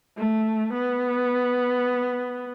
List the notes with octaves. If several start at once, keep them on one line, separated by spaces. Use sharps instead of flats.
A3
B3